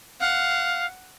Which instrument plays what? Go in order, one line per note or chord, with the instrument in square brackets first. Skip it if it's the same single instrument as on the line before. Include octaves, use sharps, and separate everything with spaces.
[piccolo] F5 [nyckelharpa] F#5